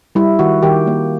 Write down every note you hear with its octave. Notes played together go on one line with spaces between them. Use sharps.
G3 E4
D#3 F#4
D#3 G4
A#3